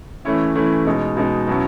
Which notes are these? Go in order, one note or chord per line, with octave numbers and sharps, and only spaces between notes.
E3 A3 C#4 E4
E3 A3 C#4 E4
B2 G#3 D#4
B2 G#3 D#4
B2 F#3 C#4 E4